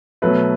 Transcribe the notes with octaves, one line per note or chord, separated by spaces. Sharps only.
B2 F#3 A3 B4